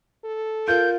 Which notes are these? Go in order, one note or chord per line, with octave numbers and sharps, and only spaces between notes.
A4
F4 A#4 G6